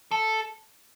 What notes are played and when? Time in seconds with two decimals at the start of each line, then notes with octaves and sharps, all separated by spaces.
0.11 A4